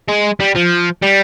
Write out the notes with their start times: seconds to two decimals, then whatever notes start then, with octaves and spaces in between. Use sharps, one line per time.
0.09 G#3
0.40 G3
0.55 F3
1.02 G3